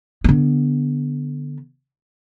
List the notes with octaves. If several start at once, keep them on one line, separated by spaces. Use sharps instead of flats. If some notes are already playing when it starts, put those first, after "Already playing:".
D3 B3